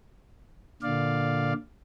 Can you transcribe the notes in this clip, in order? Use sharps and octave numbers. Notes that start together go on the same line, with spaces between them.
A#2 D3 D5 F5